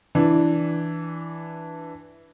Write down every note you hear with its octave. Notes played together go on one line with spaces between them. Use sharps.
E3 D4